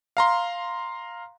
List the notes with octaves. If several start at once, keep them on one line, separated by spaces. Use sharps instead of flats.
F5 A#5 C6